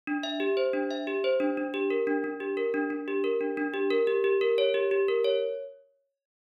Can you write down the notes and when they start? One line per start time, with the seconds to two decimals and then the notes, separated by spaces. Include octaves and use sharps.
0.07 D4
0.23 E5
0.40 G4
0.57 C5
0.73 D4
0.91 E5
1.07 G4
1.24 C5
1.40 D4
1.57 D4
1.74 G4
1.90 A#4
2.07 D4
2.24 D4
2.40 G4
2.57 A#4
2.74 D4
2.90 D4
3.08 G4
3.24 A#4
3.41 D4
3.57 D4
3.74 G4
3.91 A#4
4.07 G4
4.24 G4
4.41 A#4
4.58 C#5
4.74 G4
4.91 G4
5.08 A#4
5.24 C#5